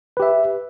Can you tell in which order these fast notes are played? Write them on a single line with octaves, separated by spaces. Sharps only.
B4 G4 E5